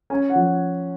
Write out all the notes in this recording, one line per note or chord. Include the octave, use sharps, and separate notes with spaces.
C#4 G#5
F#5
F3